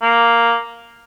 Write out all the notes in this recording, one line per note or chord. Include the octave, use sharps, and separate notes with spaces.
A#3